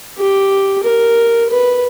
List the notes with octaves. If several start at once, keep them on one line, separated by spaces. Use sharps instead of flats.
G4
A#4
B4